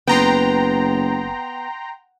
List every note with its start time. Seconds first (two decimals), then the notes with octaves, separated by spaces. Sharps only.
0.07 F#1 B3 G5 A#5 C6